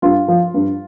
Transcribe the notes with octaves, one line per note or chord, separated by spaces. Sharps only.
G2 F4
F3
G2